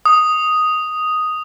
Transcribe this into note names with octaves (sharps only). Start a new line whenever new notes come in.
D#6